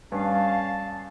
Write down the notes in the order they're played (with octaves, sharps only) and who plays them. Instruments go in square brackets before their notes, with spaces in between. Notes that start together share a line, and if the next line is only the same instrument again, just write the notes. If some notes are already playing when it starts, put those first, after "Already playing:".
[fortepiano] G2 [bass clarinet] C#4 [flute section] F5 [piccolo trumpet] A5